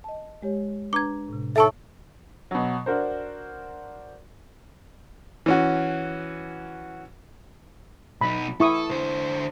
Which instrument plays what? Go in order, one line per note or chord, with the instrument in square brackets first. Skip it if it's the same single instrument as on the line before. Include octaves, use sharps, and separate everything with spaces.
[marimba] D#5 A5
G#3 G4 C#5
[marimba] D4 B4 A#5 [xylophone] D6 G#6
[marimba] A2 C3
[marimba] D#4 C#5 [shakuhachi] A4 [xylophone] E5 A5 C#6
[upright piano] B2 F#3
D4 F#4 A#4 C5
[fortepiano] E3 C#4 F#4
[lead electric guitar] B1 D#4 [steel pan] B5
[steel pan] E4 C#6 D#6 [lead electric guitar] A4
[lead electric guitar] D3 C5